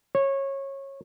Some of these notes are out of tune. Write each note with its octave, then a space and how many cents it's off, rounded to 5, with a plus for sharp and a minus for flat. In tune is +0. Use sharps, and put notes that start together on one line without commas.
C#5 -20